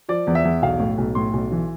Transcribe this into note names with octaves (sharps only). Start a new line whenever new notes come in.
F3 D5
E2
E5
E2
B1 F5
A2
B1
A2 C6
B1
E3